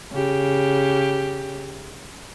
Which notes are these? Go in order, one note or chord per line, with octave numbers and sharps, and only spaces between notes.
C#3 G4